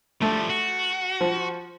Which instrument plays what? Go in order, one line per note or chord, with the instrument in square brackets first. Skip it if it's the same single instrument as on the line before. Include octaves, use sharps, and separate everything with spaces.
[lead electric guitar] F3 G3 [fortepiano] A3
[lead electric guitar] F#4
[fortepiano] F3